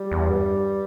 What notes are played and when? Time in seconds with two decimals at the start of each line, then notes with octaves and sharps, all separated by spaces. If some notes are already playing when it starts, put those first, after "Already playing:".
Already playing: G3
0.12 E2
0.30 G2